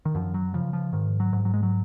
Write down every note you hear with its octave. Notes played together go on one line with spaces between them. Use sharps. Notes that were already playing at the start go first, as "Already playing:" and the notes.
D#3
F#2 F3
F#3
C#3 F3
F3
G#2 D#3
F#3
G#2
F#3
G#3
F#3